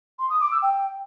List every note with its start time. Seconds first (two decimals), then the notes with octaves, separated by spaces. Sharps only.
0.19 C6
0.30 D#6
0.41 D6
0.51 E6
0.62 G5